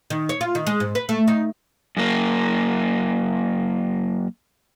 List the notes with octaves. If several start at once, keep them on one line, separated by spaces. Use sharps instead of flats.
D#3
C#5
F4
D#3
G#3
G#2
B4
A3
D#4
F#2 A#3